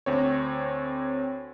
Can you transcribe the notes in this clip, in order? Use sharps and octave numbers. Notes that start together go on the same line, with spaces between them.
D2 C4 C#5